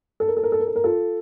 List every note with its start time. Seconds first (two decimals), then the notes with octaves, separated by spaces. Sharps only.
0.20 A4
0.28 A#4
0.37 A4
0.43 A#4
0.52 A4
0.60 A#4
0.67 A4
0.76 A#4
0.84 F4 A4